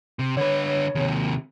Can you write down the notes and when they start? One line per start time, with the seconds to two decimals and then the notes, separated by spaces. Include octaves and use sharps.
0.19 C3
0.37 D3 B4 C#5
0.95 D#2 C3